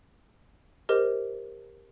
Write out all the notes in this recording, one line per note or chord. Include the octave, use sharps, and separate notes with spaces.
G4 A#4 C5 D#5